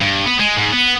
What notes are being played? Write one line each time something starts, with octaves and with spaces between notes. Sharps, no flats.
G2
B3
G#3
G#2
B3